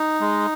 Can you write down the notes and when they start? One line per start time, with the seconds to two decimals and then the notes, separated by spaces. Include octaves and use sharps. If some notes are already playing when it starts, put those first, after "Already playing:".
Already playing: D#4
0.20 G#3